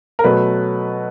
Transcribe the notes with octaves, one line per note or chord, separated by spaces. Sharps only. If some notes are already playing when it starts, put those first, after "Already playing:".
A#4
B2 F#3 A3 B4